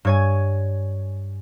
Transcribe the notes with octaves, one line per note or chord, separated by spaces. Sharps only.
G2 C#5 G#5